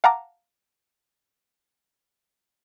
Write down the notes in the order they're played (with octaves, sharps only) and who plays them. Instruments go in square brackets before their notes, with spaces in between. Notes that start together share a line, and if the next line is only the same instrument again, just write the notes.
[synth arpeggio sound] F5 F#5 A5 A#5 D6